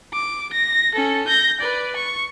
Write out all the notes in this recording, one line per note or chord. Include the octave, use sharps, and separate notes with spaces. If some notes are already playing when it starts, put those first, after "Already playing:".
D6
A#6
C#4 A4
G6 A#6
B4 D5
C#6